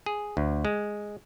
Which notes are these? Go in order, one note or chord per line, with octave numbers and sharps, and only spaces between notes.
G#4
D2
G#3